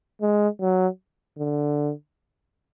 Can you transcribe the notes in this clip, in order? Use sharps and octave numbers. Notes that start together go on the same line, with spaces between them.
G#3
F#3
D3